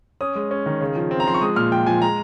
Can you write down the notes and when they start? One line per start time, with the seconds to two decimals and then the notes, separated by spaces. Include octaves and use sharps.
0.21 C#4 D#6
0.35 G#3
0.51 C#4
0.66 D#3
0.81 C#3
0.96 F3
1.11 C4
1.20 A#5
1.27 F3 C6
1.34 C#6
1.41 G#3 D#6
1.56 A#2 F6
1.72 F3 G5
1.86 F3 G#5
2.01 G#3 A#5